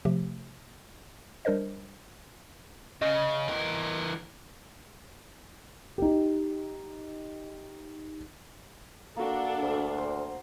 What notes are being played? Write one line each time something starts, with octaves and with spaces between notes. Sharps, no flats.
C3 F3 A3 G4
G3 D4 A#4 C5 D#5
C#3 D#5
E3 A#4
D#4 G4
A#3 D4 F#4 A4
D2
C5